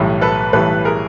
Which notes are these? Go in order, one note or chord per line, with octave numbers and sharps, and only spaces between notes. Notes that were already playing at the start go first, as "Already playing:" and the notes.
Already playing: B1 A2 E3 G3
A4 B4
B1 A2 E3 G3 A4 B4
G#4 A#4